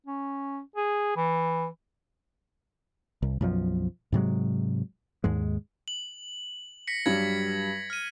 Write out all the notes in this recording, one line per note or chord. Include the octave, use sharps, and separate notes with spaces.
C#4
G#4
E3
C2
B1 F#2 F3
G#2 C3 F#3 G#3
D#2 G#2 G#3
F#7
A#6 B6 C#7
G2 F#3 G3 G#6 F#7
F6 D#7